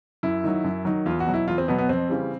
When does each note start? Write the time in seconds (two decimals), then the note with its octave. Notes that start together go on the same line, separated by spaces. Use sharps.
0.23 F#2 E4
0.44 D#3 F#3
0.64 F#2
0.85 D#3 F#3
1.06 E2 F4
1.20 F#4
1.26 B2 F#3
1.34 E4
1.48 E2 F4
1.58 C4
1.68 B2 F#3 B3
1.78 B3
1.89 F2 C4
2.09 C#3 E3 G3